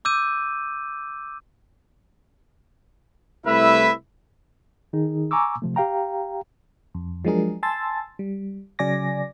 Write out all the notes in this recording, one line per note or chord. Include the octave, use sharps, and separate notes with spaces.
D6 E6 G6 D#7
C2 A3 E4 B4 E5
D#3 D#4 G#4
G#5 A#5 C#6 D6 E6
C3 F3 A3
G4 F5 G5 A#5
F2
F3 F#3 G#3 D4 G#4 A#4
G#5 A5 C6 E6 A6
G3
C#3 F#3 D5 G#5 D6 A#6